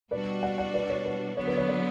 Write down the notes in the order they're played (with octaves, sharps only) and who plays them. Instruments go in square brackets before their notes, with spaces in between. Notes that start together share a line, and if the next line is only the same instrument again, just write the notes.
[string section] B2 G3 D4 F#4 [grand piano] B4 D5
[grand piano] D5 F#5
D5 F#5
B4 D5
C#5
B4
[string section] D3 F#3 B3 [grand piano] C#5
[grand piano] B4
C#5
B4 D5